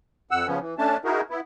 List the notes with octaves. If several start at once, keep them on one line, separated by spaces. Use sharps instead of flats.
F2 F#5 E6
C#3 F3 B3 C#4
E3
A3 C#4 D4 A5
D#4 E4 F#4 G#4 A#4
B3 E4